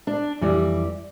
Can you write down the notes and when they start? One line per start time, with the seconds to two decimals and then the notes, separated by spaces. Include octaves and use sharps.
0.07 D4
0.41 F2 E3 G3 D5